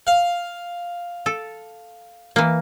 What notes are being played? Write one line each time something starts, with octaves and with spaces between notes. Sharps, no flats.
F5
A4
E3 A#3